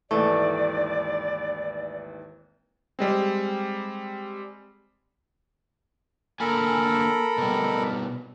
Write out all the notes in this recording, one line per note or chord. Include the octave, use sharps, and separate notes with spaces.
G#1 D#2 E3 A3 D5
G3 G#3 C4
D3 A#3 A4 A#4 G#5 B5
B2 G3